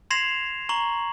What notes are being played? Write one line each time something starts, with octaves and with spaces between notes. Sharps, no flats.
C6 G#6 A#6 C7 E7 F7
A#5 C#6 F#7